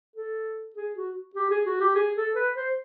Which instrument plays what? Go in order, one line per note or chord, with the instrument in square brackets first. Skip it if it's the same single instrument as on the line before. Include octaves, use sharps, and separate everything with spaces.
[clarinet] A4
G#4
F#4
G4
G#4
F#4
G4
G#4
A4
B4
C5